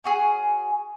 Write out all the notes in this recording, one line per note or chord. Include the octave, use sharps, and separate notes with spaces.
C#4 F#4 G#4